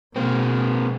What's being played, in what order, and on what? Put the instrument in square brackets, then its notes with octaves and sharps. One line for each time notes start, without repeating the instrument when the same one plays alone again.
[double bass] B2 G#3 [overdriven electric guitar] A#3 C4